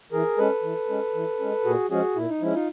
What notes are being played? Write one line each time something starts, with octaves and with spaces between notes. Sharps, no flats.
E3 G#4 A#4
G#3 C#4 A4 B4
E3
G#3 C#4
E3
G#3 C#4
A#2 F#4 G#4
F3 G#3 C#4 F#4 G#4
A#2 E4
D#4
F3 G#3 C#4 E4
D#4 F4